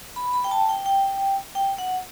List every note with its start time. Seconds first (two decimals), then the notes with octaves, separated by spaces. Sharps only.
0.16 B5
0.33 B5
0.44 G5
0.51 A5
0.69 G5
0.86 G5
1.55 G5
1.78 F#5